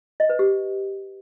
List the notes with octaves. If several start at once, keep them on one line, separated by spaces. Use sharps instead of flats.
D#5
B4
G4